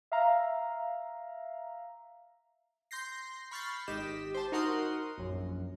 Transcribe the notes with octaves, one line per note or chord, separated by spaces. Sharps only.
E5 F5 A#5
C6 G6 A#6 C7
B5 C#6 F6 G6 A6 C7
G#1 G4 D#5 B6 E7
C5 A5
D#4 F#4 A#4 F#5 C6 D#6
A#1 F#2